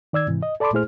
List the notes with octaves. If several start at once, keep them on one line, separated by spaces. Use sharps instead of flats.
D#3 D5 E6 G#6
G#2 C3 E3
D#5
A4 D5 A5 B5 C6 D6
A#2 A3 E4 G#4 C5 F6